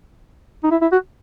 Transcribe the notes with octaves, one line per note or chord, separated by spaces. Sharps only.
D#4
E4
E4
F#4